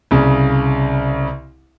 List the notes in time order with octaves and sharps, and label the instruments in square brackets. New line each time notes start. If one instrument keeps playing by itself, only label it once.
[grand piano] C2 C#3